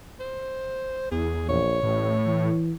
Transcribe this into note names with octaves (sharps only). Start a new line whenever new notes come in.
C5
E2 G#4
A#1 C#5
A1 A2
E3